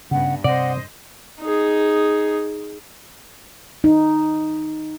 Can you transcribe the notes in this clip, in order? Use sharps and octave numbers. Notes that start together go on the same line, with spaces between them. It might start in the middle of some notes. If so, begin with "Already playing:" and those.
G2 C#3 B3 F#5
C3 C5 D5 D#5 F#5
D#4 G#4
D#4